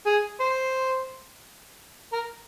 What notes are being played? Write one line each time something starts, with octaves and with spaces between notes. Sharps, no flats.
G#4
C5
A#4